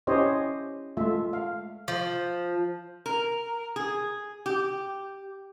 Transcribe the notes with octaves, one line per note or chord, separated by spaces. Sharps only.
C#4 E4 G4 C5 C#5 D#5
G#3 A3 F4 E5 F5
F5
F3
A#4
G#4
G4